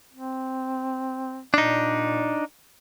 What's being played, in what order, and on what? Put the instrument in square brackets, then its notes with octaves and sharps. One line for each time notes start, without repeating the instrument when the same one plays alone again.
[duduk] C4
[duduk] A#2 [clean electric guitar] D4 D#4